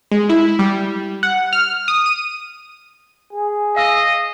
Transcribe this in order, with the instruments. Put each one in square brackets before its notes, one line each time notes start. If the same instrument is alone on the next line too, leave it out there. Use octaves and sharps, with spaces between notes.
[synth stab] G#3
E4
G3
F#5
F6
D#6
D#7
[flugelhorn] G#4
[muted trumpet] D#5 [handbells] F5 E6